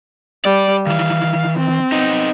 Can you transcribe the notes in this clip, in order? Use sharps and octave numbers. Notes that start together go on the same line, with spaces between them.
G3 D5
D#3 E3 F5
C4
B3 D#4